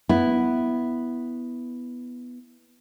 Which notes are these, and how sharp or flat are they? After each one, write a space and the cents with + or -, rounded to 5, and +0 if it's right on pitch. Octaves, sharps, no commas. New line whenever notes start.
B3 +0 E4 +0